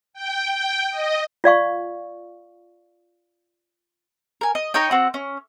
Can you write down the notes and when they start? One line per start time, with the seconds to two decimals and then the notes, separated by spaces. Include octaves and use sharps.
0.13 G5
0.52 G5
0.90 D#5
1.44 F4 D5 F5 C#6
4.41 A#4 G#5
4.55 D#5
4.74 D#4 C#5 D#5 G5
4.91 C4 F#4
5.14 C#4